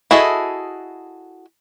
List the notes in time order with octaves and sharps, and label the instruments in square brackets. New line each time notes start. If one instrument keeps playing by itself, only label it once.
[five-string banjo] E4 F#4 G#4 A4 D#5